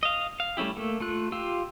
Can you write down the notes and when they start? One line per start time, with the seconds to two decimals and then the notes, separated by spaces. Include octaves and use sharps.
0.03 D#5 F5
0.40 F5
0.57 G3 A3 C#4 E4 G4
0.76 A3 A#3
1.00 A3 F4 F#6
1.32 F4 G4 F5 E6